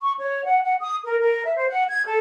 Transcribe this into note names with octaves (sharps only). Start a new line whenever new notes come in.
C#6
C#5
F#5
F#5
D#6
A#4
A#4
E5
C5
F#5
G#6
A4